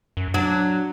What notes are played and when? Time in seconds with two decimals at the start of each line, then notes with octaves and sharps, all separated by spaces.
0.17 F#2
0.34 F#3 D4